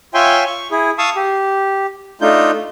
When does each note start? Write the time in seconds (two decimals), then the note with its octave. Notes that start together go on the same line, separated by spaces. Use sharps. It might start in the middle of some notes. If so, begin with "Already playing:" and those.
0.14 F4 C#5 E5 G5 G#5 C6
0.46 C#6
0.71 E4 G#4
0.98 F5 A5 C#6 D#6 E6
1.16 G4
2.21 A3 D4 D#4 F4 G6